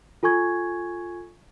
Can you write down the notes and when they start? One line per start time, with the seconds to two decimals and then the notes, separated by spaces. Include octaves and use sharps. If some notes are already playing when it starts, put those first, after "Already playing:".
0.23 F4 A4 G#5 C#6 G#6